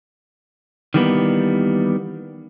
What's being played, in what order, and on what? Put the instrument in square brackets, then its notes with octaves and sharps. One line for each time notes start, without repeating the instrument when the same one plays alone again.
[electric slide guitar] D#3 E3 G3 A#3 B3